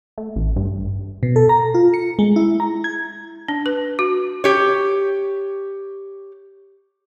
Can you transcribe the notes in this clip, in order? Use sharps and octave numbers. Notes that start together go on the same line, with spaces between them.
A3
A1
G2
B2
A4
A#5
F4
C#7
G#3
E4
A#5
G#6
D4
B4
F#4
G4 C#5